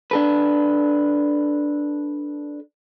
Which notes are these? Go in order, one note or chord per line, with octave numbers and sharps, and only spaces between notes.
D4 A4 B4